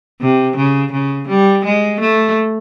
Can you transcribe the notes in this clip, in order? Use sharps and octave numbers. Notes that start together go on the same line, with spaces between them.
C3
C#3
C#3
G3
G#3
A3